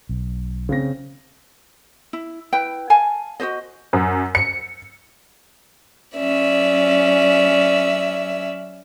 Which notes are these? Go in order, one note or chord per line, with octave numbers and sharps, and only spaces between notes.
B1
C#3 C4 A#6
E4
E4 B4 G5
F5 G#5 A5
F#4 G4 C5 D#5
F#2
C#7
F#3 C#4 D5 E5